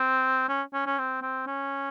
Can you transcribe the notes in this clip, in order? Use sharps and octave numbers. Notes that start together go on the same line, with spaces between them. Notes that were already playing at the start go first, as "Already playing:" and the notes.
Already playing: C4
C#4
C#4
C#4
C4
C4
C#4